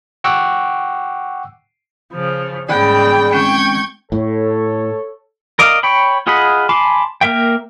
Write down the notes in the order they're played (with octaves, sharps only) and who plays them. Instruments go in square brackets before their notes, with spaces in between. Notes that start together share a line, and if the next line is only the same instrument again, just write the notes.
[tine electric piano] F#5 G5 C#6 D6 E6 F#6
[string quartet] C#3 F3
[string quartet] G#2 C#3 [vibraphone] G3 G#4 B5 [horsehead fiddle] D5 G5
[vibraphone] G#3 C4 C#4 [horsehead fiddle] G5 [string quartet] C#6 G6 G#6
[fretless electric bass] A2 [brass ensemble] A4 C#5
[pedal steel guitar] A#4 D5 D#5 F5
C#5 G5 B5
F4 G#4 D#5 F#5 B5
G#5 A5 B5 C6 D6
A#3 A#4 E5 G5